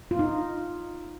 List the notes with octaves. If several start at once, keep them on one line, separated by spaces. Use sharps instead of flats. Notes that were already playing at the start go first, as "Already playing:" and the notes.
F4
D#4